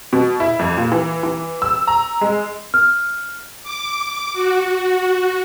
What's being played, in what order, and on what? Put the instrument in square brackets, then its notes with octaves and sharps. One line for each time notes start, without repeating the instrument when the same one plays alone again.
[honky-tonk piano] B2
E4
F2
A#2
E3
E3
E6
A#5
G#3
[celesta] F6
[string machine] D6
F#4